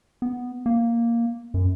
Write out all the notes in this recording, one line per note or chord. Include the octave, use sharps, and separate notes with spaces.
B3
A#3
F#2